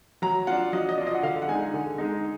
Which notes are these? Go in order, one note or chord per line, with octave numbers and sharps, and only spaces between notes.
F#3 A#5
D4 F4 F#5
F#3 D#5
D#5
D4 F4
D#5
F#5
D3 F5
F#5
G#3 D#4 G#5
D3
G#3 D#4